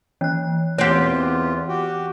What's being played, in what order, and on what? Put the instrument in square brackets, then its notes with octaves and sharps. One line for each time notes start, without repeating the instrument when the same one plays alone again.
[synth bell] E3 F#6 [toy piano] C#4
[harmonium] E2 F4 [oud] C4 G4 [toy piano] C#5 F#5
[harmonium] F#4 G4 G5